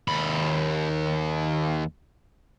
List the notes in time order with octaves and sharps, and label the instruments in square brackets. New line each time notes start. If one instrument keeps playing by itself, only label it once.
[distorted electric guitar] D#2 B5